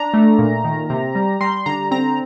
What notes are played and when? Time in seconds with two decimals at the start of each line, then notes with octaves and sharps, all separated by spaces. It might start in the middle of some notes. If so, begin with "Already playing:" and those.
Already playing: D4 A#5
0.14 A3
0.38 A#2
0.64 D#3
0.90 C3
1.15 G3
1.41 G3 C6
1.66 D3 A#5
1.91 C4 A#5